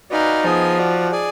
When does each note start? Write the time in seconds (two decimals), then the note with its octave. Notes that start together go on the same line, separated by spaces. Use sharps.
0.11 D#4 F#4 B4 D5 F5 G#5
0.44 F3 B3 D#4 G#4 D#5 G#5
0.78 F#4 D5 F#5
1.11 G#4 D5 G#5